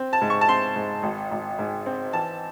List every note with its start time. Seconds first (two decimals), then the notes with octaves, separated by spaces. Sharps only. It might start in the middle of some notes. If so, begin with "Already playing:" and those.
Already playing: C4
0.13 A5
0.22 G#2
0.30 C#6
0.41 A5
0.48 C4 C6
0.76 G#2
1.03 G#1
1.31 G#1
1.59 G#2
1.86 C4
2.13 E3 A5